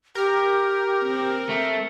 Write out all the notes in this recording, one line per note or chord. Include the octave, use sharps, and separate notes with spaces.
G4 A#4
C4
A3